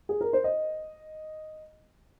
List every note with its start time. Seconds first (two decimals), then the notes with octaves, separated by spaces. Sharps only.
0.09 G#4
0.21 A#4
0.33 C5
0.44 D#5